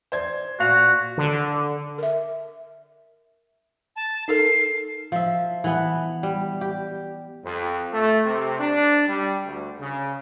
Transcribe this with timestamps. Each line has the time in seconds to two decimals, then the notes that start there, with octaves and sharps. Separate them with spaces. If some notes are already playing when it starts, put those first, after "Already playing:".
0.12 C5 D5 G#6
0.59 A#2 F#4 F5 F7
1.18 D3
1.98 A#4 E5
3.96 A5
4.28 D#4 A4 A#4 C7
5.12 F3 E5
5.64 E3 B3
6.23 G3
6.61 G4
7.44 F2
7.93 A3
8.25 C3
8.59 D4
9.08 G3
9.45 D2
9.79 C#3